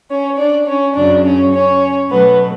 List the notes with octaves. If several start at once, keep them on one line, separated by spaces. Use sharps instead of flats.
C#4 C#5
D4 D5
C#4 C#5
F#2 C#3 F#3 D4 D5
C#4 C#5
C#4 C#5
B2 F#3 A3 B3 B4